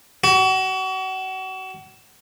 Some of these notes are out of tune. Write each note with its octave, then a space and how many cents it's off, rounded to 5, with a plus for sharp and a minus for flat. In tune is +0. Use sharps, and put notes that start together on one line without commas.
F#4 +35